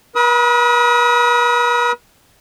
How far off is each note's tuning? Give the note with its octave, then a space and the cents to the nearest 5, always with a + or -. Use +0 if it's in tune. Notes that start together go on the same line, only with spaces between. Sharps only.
B4 -45 B5 +0 D#6 +40